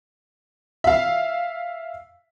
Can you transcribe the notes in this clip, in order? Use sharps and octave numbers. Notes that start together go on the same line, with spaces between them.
E5 F5